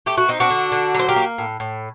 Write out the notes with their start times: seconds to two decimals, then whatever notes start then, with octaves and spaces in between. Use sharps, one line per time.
0.06 A3 G4
0.17 F#4
0.28 C4 D#4
0.40 D4 F#4
0.50 D3
0.72 D3
0.94 F#3 C5
1.09 G4 A#4
1.16 A#3
1.38 A2
1.60 A2